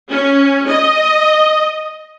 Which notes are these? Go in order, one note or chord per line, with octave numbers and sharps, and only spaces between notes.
C#4
D#5